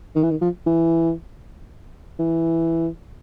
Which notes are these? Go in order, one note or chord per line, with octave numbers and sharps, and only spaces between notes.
D#3
E3
D#3
F3
E3
E3